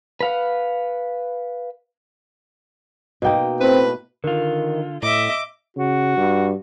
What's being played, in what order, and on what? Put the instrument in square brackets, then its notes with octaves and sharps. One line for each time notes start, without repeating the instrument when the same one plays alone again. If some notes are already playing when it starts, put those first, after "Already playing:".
[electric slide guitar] B4 F5 F#5
[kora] B2 A#3 D#4 [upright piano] D#5 G5
[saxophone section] A2 B4 [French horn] C4
[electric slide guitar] D3 F4 [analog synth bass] D#3
[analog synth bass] A2 [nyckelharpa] D#5 E5 [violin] D6
[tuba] C#3 [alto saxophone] F#4
[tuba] G2